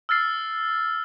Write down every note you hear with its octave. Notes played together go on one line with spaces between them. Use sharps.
E6 F6 A6 C7